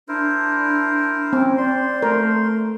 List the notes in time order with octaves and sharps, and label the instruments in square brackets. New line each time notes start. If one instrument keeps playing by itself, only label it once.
[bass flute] D4 [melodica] E4 A#4 C5
[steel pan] C4 [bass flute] C#4
[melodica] C5 C6 [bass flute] D5
[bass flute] A3 [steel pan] A#4